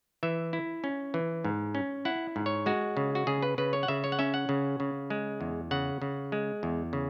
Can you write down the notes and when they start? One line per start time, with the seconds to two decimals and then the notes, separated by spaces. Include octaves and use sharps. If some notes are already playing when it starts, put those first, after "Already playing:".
0.23 E3 E5
0.53 E4
0.84 C#4
1.14 E3
1.45 G#2
1.75 C#4
2.05 E4 F#5
2.36 G#2
2.46 C#5
2.66 G#3 F#4
2.97 C#3
3.15 F#4
3.27 C#3 G#4
3.42 B4
3.58 C#3 B4
3.73 C#5
3.83 F#5
3.88 C#3 E5
4.04 C#5
4.12 F#5
4.19 C#4 E5
4.34 F#5
4.49 C#3
4.80 C#3
5.10 G#3
5.41 E2
5.71 C#3 F#5
6.02 C#3
6.32 G#3
6.63 E2
6.93 C#3